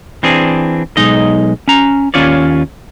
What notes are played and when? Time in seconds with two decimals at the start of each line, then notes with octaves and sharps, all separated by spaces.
0.23 E3 C4 D4 G#4
0.97 B1 G#3 D#4 D#5
1.68 C#4 A#5
2.14 D#2 C#4 F4 C#5 D5